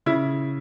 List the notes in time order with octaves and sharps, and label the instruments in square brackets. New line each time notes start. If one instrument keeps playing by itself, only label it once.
[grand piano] C#3 E4